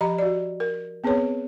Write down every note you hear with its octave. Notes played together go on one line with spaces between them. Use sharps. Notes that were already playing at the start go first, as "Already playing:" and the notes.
F3 G4 D#5 A#5 B5
F#4 D5
A#4
B3 C4 G#4 B4 C#5